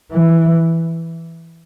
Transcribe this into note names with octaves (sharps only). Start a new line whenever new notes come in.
E3